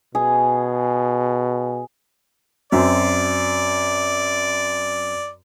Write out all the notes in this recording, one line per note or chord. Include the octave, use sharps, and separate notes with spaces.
B2 G#4
F#2 C4 D5